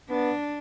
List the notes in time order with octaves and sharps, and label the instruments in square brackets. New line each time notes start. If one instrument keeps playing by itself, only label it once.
[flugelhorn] B3 [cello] D4